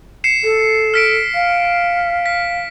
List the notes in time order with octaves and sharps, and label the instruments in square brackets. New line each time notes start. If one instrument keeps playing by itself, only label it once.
[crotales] C7 C#7 E7
[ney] A4
[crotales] F6 B6 D7
[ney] F5
[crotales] B6